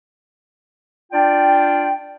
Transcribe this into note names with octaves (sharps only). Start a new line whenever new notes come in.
D4 F4 D5 G5